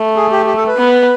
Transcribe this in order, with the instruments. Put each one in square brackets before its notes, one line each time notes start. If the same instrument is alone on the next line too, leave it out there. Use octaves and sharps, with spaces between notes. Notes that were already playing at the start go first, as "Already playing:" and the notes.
Already playing: [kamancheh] A3
[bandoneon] G#4
G4
G4
A4
B4
[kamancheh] B3